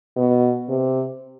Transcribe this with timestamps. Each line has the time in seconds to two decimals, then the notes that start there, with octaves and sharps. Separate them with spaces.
0.16 B2
0.68 C3